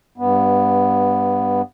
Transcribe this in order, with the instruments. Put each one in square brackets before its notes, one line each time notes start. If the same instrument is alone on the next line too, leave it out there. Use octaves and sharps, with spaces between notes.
[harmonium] G2 B3